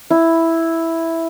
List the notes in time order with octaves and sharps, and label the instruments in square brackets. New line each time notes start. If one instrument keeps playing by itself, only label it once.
[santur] E4